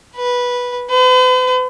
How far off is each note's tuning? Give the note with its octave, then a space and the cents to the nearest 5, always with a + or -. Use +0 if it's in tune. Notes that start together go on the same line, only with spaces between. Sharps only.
B4 -10
B4 +45